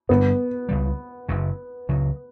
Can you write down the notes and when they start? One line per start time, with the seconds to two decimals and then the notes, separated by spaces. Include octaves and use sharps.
0.09 G1 G2 D3 G3 B3
0.69 C#2 C#3 G3
1.29 F#1 F#2 C#3
1.89 C#2 C#3 F#3